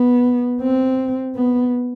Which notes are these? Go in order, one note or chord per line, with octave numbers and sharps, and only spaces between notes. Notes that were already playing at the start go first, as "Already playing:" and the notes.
Already playing: B3
C4
B3